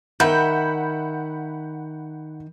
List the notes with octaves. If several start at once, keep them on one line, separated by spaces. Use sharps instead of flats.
D#3 E5 F#5 B5 G6